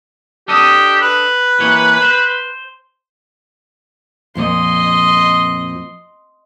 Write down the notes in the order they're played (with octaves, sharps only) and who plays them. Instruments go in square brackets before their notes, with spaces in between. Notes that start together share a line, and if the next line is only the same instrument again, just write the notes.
[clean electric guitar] D4 A4 D#5 [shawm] G4
[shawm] B4
[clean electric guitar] E3 A#3 C#5
C5
[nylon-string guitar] F2 A#2 F3 [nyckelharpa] D#5 C6